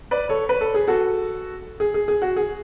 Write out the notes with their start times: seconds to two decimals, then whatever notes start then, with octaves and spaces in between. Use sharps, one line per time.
0.11 B4 D5
0.29 A4 C#5
0.49 B4
0.61 A4
0.74 G#4
0.88 F#4 A4
1.80 G#4
1.94 G#4
2.08 G#4
2.22 F#4
2.36 G#4